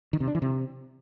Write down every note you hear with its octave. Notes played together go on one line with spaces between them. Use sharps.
D#3
C3
D4
E3
C3